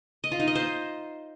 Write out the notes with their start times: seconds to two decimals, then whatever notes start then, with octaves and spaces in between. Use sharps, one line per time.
0.24 D#5
0.32 F4
0.40 D#4
0.47 D#5
0.55 C5